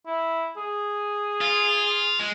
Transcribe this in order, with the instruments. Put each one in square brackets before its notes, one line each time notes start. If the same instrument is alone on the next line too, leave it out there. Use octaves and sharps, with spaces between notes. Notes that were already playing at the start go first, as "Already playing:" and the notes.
[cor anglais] E4
G#4
[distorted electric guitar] F4
G#3